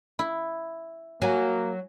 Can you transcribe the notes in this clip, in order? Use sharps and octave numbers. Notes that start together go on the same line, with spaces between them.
E4
F#3 A#3 G#5